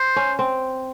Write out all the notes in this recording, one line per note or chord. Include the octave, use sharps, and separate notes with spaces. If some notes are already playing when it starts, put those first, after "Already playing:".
Already playing: C5
C#4
C4